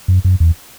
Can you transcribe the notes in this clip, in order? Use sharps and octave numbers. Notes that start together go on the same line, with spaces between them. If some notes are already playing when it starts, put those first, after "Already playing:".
F#2
F#2
E2